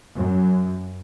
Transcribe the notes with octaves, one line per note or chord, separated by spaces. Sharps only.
F#2